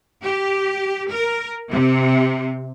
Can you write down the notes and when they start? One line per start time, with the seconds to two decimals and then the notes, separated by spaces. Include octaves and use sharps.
0.24 G4
1.11 A#4
1.70 C3